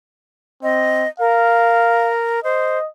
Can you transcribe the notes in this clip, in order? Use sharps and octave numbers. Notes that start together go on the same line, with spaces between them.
C4 D#5
A#4 F5
C5 D#5